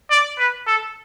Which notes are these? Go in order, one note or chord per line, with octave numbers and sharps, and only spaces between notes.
D5
B4
A4